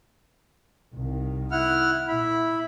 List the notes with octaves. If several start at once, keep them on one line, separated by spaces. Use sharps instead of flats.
C2 D#3
E4 F#5 F6
A#2 E4 B5